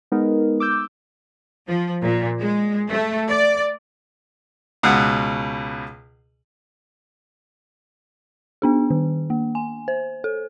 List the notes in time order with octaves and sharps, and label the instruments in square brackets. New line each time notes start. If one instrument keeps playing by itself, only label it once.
[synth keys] G#3 B3 D#4 A#4
D6 E6 G6
[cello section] F3
A#2
G#3
A3
D5
[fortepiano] C#2 B2 F#5
[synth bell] B3 D4 G#4
D#3
A#3
G#5
C5
A4